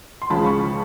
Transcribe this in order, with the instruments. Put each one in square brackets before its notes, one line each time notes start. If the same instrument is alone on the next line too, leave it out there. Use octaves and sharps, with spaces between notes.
[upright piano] C6
C#2 C#3 F3 G#3 A5 B5
B5 C#6